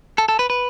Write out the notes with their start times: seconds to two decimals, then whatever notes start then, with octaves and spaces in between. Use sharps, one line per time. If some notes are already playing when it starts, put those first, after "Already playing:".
0.18 A4
0.29 A4
0.39 B4
0.50 B4